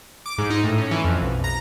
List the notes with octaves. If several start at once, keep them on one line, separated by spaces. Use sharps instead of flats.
D6
G#2
D#4
A2
C#4
E3
F2
B1
A#5